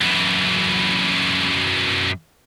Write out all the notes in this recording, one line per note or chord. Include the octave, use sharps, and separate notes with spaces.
F#2 E3